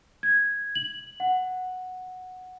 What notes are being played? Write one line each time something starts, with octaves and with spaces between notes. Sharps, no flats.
G#6
F#7
F#5